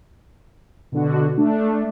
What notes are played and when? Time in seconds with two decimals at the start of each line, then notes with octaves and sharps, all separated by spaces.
0.92 B2 D3 F#4
1.37 A3 D4